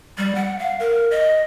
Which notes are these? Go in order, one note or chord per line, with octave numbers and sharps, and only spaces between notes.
G3
F#5
F5
A#4
D#5